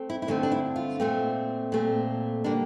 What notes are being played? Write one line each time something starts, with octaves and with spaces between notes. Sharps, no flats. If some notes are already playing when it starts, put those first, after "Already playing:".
Already playing: A3 C4
E4
E4
G2 D3 A3 C4 D4
D4
E4
F4
A#2 A3 C4
A#2 A3 C4
D3 G3 A#3 D4